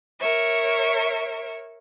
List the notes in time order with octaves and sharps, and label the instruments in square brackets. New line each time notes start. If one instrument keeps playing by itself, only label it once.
[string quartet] A#4 C#5 E5